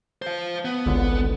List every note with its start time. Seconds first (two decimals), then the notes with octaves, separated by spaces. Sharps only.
0.22 C5 F5
0.65 B3
0.86 G#1 C#2 D3